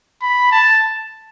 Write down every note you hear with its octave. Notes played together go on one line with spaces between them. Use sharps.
B5
A5